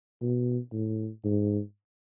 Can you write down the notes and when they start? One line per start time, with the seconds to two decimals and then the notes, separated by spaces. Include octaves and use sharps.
0.22 B2
0.73 A2
1.24 G#2